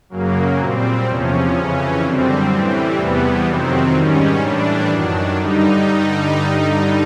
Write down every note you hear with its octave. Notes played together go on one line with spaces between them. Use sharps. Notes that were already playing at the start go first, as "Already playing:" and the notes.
F#2 C#3 F#3 A#3
A#2 G3 C4
E2 C3 F3 C#4
F2 C#3 E3
F#2 D3 G3 C4
A2 E3 G3 C4
E2 C3 E3 G3 B3
F2 C3 D#3 F#3 C4
G#2 D#3 G3 C#4
A2 E3 G3 D4
F#2 D#3 F#3 D4
G2 D3 G3 D#4